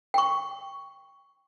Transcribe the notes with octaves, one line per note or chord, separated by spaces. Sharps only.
G5 C#6